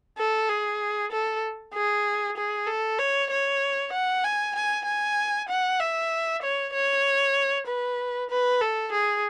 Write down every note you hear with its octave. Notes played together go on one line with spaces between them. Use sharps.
A4
G#4
A4
G#4
G#4
A4
C#5
C#5
F#5
G#5
G#5
G#5
F#5
E5
C#5
C#5
B4
B4
A4
G#4